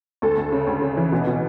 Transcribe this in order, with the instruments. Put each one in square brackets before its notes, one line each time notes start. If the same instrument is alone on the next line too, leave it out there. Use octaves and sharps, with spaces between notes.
[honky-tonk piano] D2 A4
D2
C#3
D2
C#3
E3
B2
B2